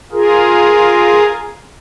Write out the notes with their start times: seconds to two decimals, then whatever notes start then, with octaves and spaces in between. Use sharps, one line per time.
0.12 F4 G#4 A#4